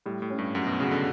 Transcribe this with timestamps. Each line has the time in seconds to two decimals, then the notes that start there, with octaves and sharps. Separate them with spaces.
0.06 A2 G3
0.22 A2
0.30 C#4
0.38 G2
0.54 F#2 F#4
0.66 B2
0.80 C#3 F#4
0.91 D3